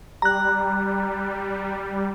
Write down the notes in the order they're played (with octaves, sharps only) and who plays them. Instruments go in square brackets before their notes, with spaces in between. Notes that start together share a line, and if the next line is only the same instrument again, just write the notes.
[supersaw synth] G3 [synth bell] A#5 F#6